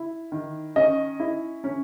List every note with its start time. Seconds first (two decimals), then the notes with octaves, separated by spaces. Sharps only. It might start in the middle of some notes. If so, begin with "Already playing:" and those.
Already playing: E4
0.32 D#3
0.76 C#4 D#5
1.20 E4
1.64 C#4